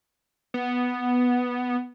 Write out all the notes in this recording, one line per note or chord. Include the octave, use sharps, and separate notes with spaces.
B3